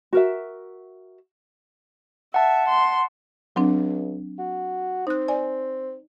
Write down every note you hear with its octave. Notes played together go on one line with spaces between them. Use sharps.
F#4 A#4 E5
E5 F#5 A5
C6
C#2 F#3 C4 D4
F#4
C4 D#4 F#6
D5 G#5